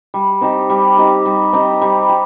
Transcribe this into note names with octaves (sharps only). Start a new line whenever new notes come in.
G3
C4 D#4 G4
G3
C4 D#4 G4
G3
C4 D#4 G4
G3
G4